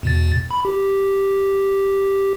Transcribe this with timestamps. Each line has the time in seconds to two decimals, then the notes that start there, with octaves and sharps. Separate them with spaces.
0.03 E2 B2 A6
0.51 B5
0.65 G4